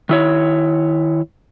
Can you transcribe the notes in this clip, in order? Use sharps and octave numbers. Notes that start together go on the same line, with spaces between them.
D#3 E4 C#5